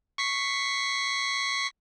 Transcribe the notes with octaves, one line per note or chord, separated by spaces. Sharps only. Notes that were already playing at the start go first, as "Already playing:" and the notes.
C#6 B6 C7